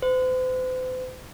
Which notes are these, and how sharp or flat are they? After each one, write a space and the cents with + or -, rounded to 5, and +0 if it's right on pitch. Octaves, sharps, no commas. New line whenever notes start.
C5 -45